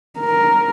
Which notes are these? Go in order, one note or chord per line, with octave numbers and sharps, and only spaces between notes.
A#4